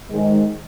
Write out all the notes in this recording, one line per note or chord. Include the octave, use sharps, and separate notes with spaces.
G#2 D#3 G#3